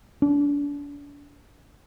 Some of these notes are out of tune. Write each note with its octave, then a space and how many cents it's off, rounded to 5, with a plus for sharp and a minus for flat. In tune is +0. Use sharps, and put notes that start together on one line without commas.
D4 -35